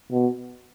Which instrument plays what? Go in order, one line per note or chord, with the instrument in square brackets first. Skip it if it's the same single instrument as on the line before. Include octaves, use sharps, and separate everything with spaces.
[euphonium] B2